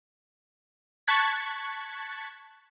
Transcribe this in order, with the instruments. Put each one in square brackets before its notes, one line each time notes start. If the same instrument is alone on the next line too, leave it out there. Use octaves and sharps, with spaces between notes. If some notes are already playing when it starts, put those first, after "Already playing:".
[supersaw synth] A5 C#6 F#6 G#6 A6 B6